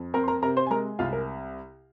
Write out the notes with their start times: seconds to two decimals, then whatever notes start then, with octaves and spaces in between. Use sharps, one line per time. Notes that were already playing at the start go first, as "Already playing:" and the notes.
Already playing: F2
0.14 C4 A#4 A#5
0.24 C6
0.28 A#4 A#5
0.43 C3 A#4 A#5
0.57 C5 C6
0.67 G#5
0.70 G#3 A#4 A#5
0.99 C2 F4 F5
1.13 A#4